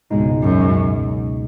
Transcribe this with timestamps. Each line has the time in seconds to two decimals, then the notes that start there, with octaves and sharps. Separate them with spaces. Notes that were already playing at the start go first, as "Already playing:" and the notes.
0.10 C#2 G#2 B2 G#3 D#4
0.42 F#2